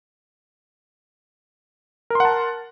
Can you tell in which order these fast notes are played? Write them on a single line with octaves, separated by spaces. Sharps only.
A#4 C6 F#5 A5